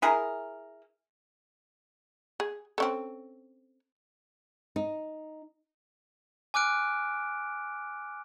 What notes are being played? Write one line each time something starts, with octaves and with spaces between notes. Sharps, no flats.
E4 G#4 A#4
G#4
C4 C#4 A4
D#4
G#5 D6 F6 F#6 D7